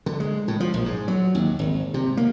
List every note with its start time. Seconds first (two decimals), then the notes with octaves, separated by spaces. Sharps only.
0.06 D3
0.20 G#3
0.48 A2
0.60 F3
0.74 A#1
0.86 G#2
1.08 F#3
1.35 D#2
1.59 G#1
1.94 C3
2.17 A#3